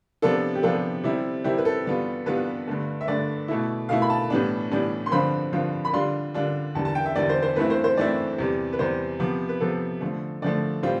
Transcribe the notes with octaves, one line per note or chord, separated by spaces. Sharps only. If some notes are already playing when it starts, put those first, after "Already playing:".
C3 F3 B3 D4 F4 A4
G4
C3 F3 B3 D4 F4 A4
C3 G3 C4 E4
C3 G3 C4 E4 G4
B4
A4
G2 E3 G3 B3 F4
G2 E3 G3 B3 F4 B4
G2 D3 A3
E5
G2 D3 A3 D5
B2 A3 E4
B2 A3 E4 F5
B5
A5
A2 E3 G3 B3 D4
A2 E3 G3 B3 D4
C6
G2 D3 F3 C4 F4 B5
G2 D3 F3 C4 F4
B5
D3 G3 D4 F4 C6
D3 G3 D4 F4
E2 D3 G3 A5
A5
G5
E5
E2 D3 G3 D5
C5
C5
G2 E3 A3 C4 E4 B4
C5
C5
G2 E3 A3 C4 E4 D5
E2 C3 G3
B4
E2 C3 G3 C5
C3 F3 B3
B4
C3 F3 B3 A4
D3 F3 A3
D3 F3 A3 D5
A2 E3 G3 C4 F4